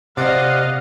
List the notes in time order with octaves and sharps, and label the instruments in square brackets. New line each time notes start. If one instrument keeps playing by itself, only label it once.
[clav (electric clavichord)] C3 [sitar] D5 [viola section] D#5 F5 [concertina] F#5